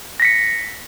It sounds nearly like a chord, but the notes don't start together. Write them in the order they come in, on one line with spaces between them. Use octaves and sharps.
A#6 B6 C#7